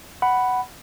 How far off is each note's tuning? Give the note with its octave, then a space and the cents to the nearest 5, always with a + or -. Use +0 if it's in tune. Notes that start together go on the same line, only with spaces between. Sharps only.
F#5 +10 B5 +0